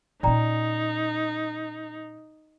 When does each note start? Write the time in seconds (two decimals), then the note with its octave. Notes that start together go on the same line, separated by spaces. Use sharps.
0.23 A#2 C#4 D#4 D5 G5 A#5